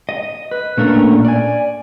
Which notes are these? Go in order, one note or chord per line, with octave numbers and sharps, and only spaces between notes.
D#5
B4
A#2 A3 A#3 C#4 D4 A#4
D5 G#5